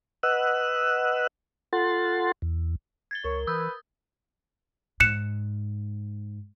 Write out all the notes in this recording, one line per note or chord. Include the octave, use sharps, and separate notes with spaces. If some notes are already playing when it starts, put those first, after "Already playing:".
B4 D#5 F#5 E6 F#6
F4 A4 F#5 C6 A6
E2
G#6 A6 G7
C#2 A#4 C#5
E3 B4 D#6 E6 G6
G#2 F#6 C#7 E7